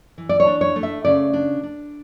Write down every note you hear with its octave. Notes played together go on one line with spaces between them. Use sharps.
E3
D5
C#5
D4
C#5
A3
E5
C#3 D5
D4
D4